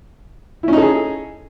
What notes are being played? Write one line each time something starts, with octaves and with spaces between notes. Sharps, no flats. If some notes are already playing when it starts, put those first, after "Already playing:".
C#4 D#4 E4 G#4 A4